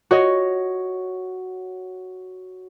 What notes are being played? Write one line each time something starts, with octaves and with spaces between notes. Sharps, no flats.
F#4 C#5 D#5